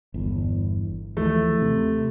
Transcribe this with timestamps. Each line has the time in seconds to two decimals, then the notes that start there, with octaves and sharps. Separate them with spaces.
0.14 G1 E2
1.17 D#2 E3 F3 A3
1.62 C3